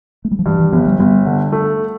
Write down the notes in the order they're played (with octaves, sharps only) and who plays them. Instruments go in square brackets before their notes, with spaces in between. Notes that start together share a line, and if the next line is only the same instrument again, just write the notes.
[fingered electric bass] A3
G3
F3
[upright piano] G2 [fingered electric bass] E3
[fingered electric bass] E3
[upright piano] G1 [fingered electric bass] F3
[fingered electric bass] G3
[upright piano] G1 [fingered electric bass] G3
[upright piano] D3
A3